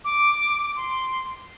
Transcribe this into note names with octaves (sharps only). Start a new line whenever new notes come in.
D6
C6